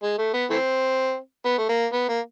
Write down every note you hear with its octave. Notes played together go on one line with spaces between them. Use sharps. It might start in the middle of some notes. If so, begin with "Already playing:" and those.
G#3
A3
B3
E3 A3 C4
B3
A3
A#3
B3
A#3